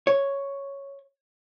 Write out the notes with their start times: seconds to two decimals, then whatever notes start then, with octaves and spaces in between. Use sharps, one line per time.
0.07 C#5